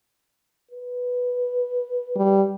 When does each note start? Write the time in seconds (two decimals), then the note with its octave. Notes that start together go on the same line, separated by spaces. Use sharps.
0.71 B4
2.16 G3